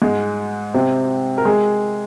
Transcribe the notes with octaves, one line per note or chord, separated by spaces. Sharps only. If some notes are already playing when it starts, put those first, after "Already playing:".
G#2 G#3
C3 C4
A#4
G#3 G#4